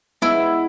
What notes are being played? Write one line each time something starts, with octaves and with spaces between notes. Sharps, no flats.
G#3 B3 E4